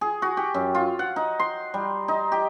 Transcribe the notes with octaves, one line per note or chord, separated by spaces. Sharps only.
G#4
F#4
G4
F#2
F4
F#5
D#4
C6
G3
D#4
G4